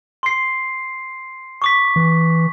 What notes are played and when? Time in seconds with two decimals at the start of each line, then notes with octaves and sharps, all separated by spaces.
0.23 C6 C7
1.62 C#6 D6 B6
1.96 E3